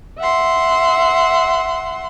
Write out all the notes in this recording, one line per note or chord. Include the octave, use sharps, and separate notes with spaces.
E5 F#5 C6